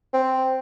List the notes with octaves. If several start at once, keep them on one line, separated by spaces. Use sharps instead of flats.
C4